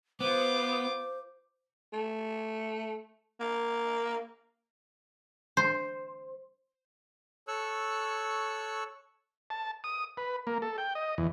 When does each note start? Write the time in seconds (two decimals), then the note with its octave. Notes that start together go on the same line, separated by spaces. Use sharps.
0.20 B3 F4 C5 D6
1.93 A3
3.40 A#3
5.57 C5
7.48 A4 C#5 C#6 E6 F#6
9.50 A5
9.84 D#6
10.17 B4
10.47 A#3
10.62 A4
10.78 G5
10.95 D#5
11.18 E2